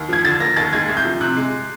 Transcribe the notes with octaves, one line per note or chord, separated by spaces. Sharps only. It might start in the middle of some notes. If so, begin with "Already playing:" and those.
Already playing: D#2
F3 G#6
D3 A6
A#3 A#6
D#2 A6
G#3 G#6
C2
G6
F3
C3 F#6
G#3